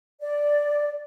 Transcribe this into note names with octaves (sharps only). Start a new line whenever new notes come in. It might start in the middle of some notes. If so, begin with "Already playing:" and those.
D5